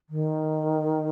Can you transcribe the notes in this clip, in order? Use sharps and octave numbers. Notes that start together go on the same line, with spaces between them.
D#3